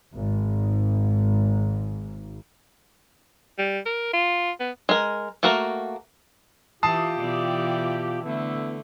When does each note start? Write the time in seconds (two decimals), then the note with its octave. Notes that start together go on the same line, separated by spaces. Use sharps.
0.14 G#1 G#2
3.58 G3
3.86 A#4
4.13 F4
4.60 B3
4.89 G#3 A#4
5.43 A3 A#3 F#4 A#4 A#5
6.83 E3 F4 G4 A5 D#6 C7
7.17 B2 E3 D5
8.23 D3 A3 B3 E4